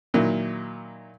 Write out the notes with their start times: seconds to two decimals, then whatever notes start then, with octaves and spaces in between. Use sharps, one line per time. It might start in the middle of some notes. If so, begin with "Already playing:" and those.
0.14 A#2 D#3 F#3 E4